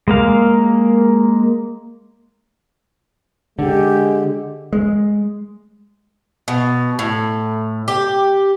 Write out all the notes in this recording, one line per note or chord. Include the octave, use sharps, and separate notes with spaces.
G#3 A#3 F5
D3 G#3 G4
G#3
B2
A2
G4